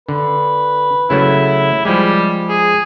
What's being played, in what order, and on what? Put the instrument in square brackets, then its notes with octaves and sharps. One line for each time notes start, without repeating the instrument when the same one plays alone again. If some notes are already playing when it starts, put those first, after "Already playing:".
[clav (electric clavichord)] D3 [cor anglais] B4
[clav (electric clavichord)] C#3 F#3 A3 [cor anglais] E4
[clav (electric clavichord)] F3 G#3 [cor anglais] G3
[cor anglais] G#4